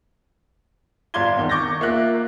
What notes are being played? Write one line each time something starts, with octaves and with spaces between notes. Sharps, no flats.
G1 D5 F5 C6 G#6 G7
E2 D#3
C#6 D6 G6 A6 A#6
A#3 F4 E5 F#6